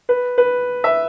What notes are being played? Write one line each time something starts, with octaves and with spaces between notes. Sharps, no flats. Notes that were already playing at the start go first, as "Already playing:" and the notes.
B4
B4
E5